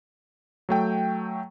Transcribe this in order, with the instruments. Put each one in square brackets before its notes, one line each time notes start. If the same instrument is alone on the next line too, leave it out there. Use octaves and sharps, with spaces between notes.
[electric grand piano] F#3 A3 G5